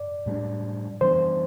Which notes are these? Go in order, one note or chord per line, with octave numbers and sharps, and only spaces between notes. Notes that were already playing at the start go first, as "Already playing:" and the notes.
Already playing: D5
A2 G3 B3 D4
E3 G3 B3 D4 C5